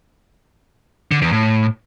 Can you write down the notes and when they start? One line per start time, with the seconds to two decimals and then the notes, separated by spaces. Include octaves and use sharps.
1.12 D3
1.22 E2
1.32 A2